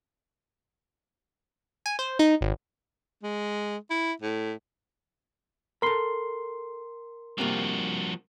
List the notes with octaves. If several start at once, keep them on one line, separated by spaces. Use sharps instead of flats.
G#5
C5
D#4
G#1
G#3
E4
A2
A4 A#4 B5 C6
G2 C3 F3 A#3 F#4